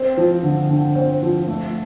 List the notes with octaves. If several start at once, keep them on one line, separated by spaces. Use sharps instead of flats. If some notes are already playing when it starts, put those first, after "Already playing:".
Already playing: C4
F3
D3
D3
C4
F3
A3